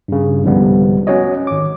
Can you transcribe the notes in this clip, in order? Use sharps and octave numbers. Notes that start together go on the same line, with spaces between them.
G2 C#3
C2 G#2 D3 F3 G3 B3
C#4 F#4 C#5 D#5
G#1 D6